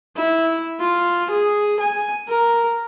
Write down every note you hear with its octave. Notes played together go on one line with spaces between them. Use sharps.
E4
F4
G#4
G#5
A#4